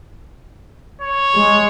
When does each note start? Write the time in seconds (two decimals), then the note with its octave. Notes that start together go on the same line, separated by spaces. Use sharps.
1.01 C#5
1.35 G#3